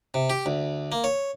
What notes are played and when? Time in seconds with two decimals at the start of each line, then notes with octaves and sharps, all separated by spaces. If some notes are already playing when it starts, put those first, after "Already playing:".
0.14 C3
0.30 G4
0.46 D2
0.92 A#3
1.04 C#5